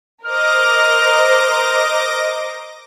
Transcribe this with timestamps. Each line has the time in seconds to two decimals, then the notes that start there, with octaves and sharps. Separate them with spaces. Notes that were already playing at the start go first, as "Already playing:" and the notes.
0.24 A#4 C5 D#5 D6 F6 A#6